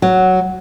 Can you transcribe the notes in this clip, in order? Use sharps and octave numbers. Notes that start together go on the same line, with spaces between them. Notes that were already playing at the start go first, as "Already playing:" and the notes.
F#3